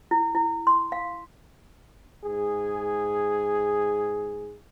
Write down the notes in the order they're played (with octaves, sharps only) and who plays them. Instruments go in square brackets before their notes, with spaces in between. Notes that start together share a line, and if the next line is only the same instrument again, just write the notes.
[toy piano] E4
E4
C6
F5
[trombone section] G#2 G#4